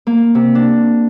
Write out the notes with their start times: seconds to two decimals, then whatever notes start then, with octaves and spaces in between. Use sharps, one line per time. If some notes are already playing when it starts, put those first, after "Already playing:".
0.07 A#3
0.35 C3
0.55 D4